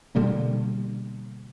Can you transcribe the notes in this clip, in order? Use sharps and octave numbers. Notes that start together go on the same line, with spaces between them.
B2 D3 G3 A#3